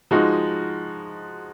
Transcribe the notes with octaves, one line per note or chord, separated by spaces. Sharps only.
F3 G#3 D#4 F#4